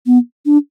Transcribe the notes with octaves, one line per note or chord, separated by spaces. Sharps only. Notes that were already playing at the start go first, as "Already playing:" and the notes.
B3
D4